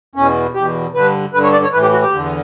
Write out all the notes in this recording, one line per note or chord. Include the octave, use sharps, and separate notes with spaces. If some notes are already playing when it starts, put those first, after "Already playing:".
E2 B2 C#4
E2 B2 G4
G2 D3 B4
G2 D3 B4
C#5
D5
C#5
A2 E3 B4
G4
F#4
G4
E2 D3